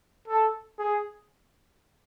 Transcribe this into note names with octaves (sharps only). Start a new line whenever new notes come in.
A4
G#4